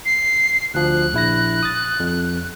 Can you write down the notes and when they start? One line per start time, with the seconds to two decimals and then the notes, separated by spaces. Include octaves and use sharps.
0.05 C7
0.74 D2 F3 F#6
1.13 A#1 E4 A#6
1.63 D#6 A6
2.00 F2